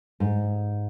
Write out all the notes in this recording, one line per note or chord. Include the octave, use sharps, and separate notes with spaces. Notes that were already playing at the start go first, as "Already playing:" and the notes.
G#2